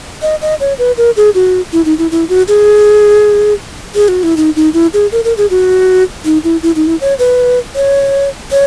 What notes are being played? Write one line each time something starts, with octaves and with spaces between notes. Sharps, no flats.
D#5
D#5
C#5
B4
A#4
G#4
F#4
E4
D#4
E4
E4
F#4
G#4
G#4
F#4
E4
D#4
D#4
E4
G#4
A#4
A#4
G#4
F#4
D#4
E4
E4
D#4
E4
C#5
B4
C#5
C#5